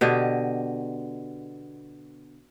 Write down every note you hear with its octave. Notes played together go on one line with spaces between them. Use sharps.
B2 D3 G4 D#5